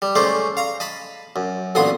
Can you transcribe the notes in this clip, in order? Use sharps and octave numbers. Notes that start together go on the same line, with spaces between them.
G3
G#3 A3 C#4 C5 D5
F5 A#5
D#5 A5 B5
F#2
A1 D2 A#2 B3 C6 D#6